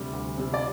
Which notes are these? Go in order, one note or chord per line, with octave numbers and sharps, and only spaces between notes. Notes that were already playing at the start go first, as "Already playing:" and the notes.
Already playing: D2 C3 G3
D2
C3 G3
D5